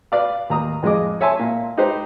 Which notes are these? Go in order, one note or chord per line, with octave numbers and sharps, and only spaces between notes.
B4 D5 F5
D#2 A#5 D#6
F2 G#3 G#4 D#5 D6
C#5 E5 G#5 A5 C6
A#2
D#4 G4 B4 C5